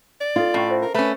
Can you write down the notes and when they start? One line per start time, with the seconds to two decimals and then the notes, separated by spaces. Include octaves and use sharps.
0.20 D5
0.36 D4 F4 A4
0.54 A2 C#4 A#5 C#6
0.68 A4 C5 E5
0.82 A#4
0.94 A3 C#4 B4